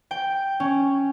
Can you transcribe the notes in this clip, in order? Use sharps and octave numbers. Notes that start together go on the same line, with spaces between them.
G5
C#4